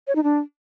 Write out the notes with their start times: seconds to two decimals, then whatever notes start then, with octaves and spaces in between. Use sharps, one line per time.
0.07 C#5
0.15 D#4
0.24 D4